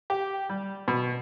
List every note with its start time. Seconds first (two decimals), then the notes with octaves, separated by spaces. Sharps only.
0.10 G4
0.50 G3
0.88 B2